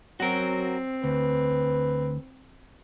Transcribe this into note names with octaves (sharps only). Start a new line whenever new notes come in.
F#3 C4 F#4 A#4
D2 B4